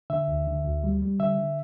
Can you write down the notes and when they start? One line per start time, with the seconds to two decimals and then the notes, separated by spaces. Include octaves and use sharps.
0.10 D3 E5
0.28 D2
0.47 D3
0.65 D2
0.84 G3
1.02 G3
1.20 D3 E5
1.38 D3